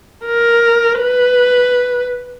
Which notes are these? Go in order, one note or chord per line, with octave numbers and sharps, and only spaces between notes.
A#4
B4